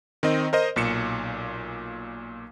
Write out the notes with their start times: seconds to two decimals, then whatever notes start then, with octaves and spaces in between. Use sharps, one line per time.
0.23 D#3 C4 D#5
0.53 A#4 C5 D#5
0.76 B1 A#2 C#7 E7